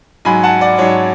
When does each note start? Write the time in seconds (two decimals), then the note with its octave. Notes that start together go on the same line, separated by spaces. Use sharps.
0.25 G#2 F#3 G#5 B5
0.43 F#5 A5
0.61 D5 F#5
0.79 G#2 F#3 C#5